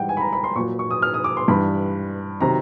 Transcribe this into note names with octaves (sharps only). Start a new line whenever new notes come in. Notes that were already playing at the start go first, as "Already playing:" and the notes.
Already playing: G#2 E3 G3 F#5 G5
G#5
B5
A#5
B5
C6
A#2 F#3 C#6
C#6
D#6
F6
D#6
D6
C6
G2 E3 G3 B5
C3 D#3 F#3 A#5